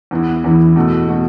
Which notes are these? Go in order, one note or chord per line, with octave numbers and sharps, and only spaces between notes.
E2 E3 B3 E4
E2 E3 B3 E4
E2 B2 A3 F#4
B2 A3 F#4